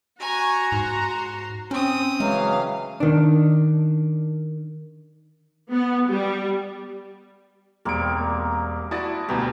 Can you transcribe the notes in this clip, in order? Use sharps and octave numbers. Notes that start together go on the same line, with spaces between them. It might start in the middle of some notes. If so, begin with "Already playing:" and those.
F#4 G#5 A#5 C#6
G#2 C6
C4 C#4 G5 D#6
C#3 E3 F#3 G#3 F5
D#3 D4
B3
G3
E1 G3 A#3 C4 D7
E4 F#4 D5 A5 D#6 A6
D2 B2 G3 G4 B4 A#5